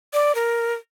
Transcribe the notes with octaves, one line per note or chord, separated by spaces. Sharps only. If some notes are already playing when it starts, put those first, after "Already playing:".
D5
A#4